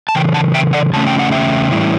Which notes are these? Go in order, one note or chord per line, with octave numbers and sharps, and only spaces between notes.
A5
C#3 E3 G5
F#5 A5
E5 G5
D5 F#5
E2 C#3 A3 C#4 A5
G5
F#5
E5 G5
A2 E3 G3 C#4 E4